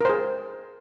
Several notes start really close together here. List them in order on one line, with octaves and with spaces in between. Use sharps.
A#4 C5 G#4